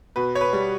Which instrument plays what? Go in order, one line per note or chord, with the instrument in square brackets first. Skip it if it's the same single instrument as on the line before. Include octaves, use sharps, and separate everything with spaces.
[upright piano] B2 B4
C#5
B4
G3